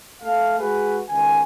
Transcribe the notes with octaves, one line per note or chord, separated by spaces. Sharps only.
A3 A4 F5
G#3 F#4 G#4 B4
C#2 D#3 G#5